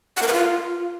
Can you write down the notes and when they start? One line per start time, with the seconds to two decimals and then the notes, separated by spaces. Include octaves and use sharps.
0.17 F#5
0.22 A#4
0.28 B4
0.33 F4